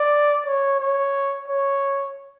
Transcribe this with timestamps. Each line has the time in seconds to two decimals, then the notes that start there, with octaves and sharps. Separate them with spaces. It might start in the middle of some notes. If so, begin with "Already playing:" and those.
Already playing: D5
0.46 C#5
0.80 C#5
1.48 C#5